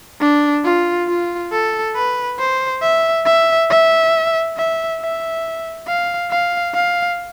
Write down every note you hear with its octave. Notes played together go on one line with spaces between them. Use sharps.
D4
F4
F4
A4
B4
C5
E5
E5
E5
E5
E5
F5
F5
F5